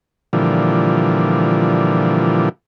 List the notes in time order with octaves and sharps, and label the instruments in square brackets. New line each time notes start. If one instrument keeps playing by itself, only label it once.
[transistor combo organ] A#2 D3 E3 F3 G3